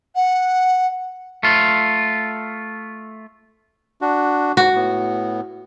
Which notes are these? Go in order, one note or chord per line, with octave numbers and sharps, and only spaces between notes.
F#5
A3 F4
D4 F#4
G#2 F#4
A2 B3